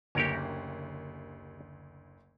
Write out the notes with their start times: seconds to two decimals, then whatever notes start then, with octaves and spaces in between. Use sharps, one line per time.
0.15 F#1 D2 G4 A#4 C#5 D7